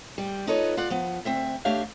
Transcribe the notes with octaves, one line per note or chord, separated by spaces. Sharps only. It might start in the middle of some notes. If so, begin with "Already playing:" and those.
G3
D#4 F4 A4 B4 C#5 D#5
F4 D5 F#5
F3 B3
D2 C4 E5
A3 D4 G4 C#5 E5 F5